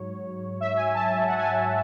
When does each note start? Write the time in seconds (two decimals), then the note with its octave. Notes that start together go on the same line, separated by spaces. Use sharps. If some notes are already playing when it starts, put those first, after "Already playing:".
Already playing: G#2 F#3 C#5
0.61 E5
0.77 G#5
0.94 A5
1.10 G#5
1.27 F#5
1.39 G#5
1.43 A5
1.60 G#5